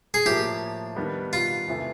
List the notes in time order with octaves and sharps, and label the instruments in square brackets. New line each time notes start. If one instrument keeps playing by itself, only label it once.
[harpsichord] G#4
[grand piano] A2 F3 A#3 [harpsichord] G4
[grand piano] D#3 G3 B3 D4
[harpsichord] F4
[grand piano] E2 C3 E3 A3